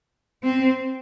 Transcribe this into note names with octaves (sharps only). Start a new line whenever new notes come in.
C4